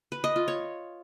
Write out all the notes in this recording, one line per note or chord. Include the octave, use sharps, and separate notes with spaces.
B4
D#5
F4
C#5